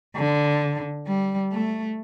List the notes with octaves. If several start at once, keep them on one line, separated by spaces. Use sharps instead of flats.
D3
G3
A3